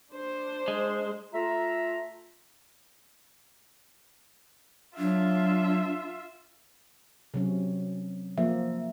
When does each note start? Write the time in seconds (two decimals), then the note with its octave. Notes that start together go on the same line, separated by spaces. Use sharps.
0.12 D4 C5
0.68 G#3
1.34 A3 F4 E5 A#5
4.98 F#3 D4 F4 E5
7.34 C3 F#3 C#4
8.38 F3 A#3 E5